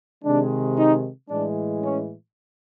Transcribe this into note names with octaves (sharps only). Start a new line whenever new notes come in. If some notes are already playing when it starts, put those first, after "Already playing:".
C3 D#3 G#3 D4
D#4
A2 E3 G#3 D4
C#4